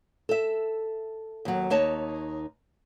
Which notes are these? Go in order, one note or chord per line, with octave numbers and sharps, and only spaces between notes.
A4 E5
D#2 F#3
D#2 D#4 C#5 A5